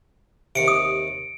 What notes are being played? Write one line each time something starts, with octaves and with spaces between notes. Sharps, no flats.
D#2 C3 C#7 D7
D#6